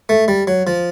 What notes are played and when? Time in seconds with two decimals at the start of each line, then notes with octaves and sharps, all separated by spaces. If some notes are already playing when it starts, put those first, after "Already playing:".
0.09 A3
0.28 G3
0.47 F#3
0.67 F3